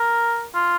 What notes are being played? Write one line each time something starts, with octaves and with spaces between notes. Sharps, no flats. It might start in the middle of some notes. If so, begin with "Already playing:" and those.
Already playing: A#4
F4